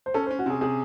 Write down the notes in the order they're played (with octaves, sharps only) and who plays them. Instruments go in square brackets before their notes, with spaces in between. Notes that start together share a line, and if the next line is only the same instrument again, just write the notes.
[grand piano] C5
[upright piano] C#4 [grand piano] A4
[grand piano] C5
[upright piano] C#4
[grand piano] F#4
[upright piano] C3 [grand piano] G#4
[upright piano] C3 [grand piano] G#4